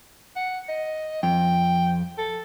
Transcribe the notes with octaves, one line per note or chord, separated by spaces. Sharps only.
F#5
D#5
F2 G5
A4